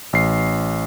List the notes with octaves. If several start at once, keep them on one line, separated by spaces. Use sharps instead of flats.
A1 C7